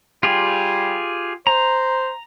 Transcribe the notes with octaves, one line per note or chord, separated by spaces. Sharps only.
G3 F4 G4 G#4
C5 A#5